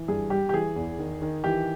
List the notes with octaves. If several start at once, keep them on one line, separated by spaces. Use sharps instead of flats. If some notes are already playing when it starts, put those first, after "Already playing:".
Already playing: E3
G2 G#4
G3 G4
G4
E3 G#4
E2
D#3
D#3
E3 G4